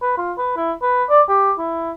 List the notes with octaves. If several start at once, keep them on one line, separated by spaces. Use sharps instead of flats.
B4
F4
B4
E4
B4
D5
G4
E4